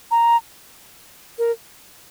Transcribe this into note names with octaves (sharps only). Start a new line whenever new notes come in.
A#5
A#4